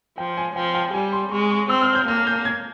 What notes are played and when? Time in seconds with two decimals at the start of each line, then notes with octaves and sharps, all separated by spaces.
0.18 F3 G5
0.37 G#5
0.56 F3 G5
0.75 G5
0.94 G3 G#5
1.13 C6
1.31 G#3 C#6
1.51 C#6
1.70 C4 E6
1.82 F6
1.95 G6
2.08 A#3 F6
2.27 G6
2.45 G#6